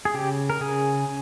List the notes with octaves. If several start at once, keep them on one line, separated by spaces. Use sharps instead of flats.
G#4
C#3 G4
A#4
C#3 G#4